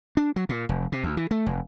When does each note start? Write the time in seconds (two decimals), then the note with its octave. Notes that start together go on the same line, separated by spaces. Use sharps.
0.17 D4
0.36 F#3
0.49 A#2
0.69 F1
0.92 C3
1.04 D2
1.17 E3
1.31 A3
1.46 F1